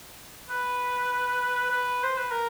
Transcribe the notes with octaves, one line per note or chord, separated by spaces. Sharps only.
B4
B4
C5
B4
A#4